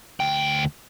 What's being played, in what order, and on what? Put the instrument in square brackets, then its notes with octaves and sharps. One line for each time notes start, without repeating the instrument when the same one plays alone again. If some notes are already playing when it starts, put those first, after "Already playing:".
[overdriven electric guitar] D2 G5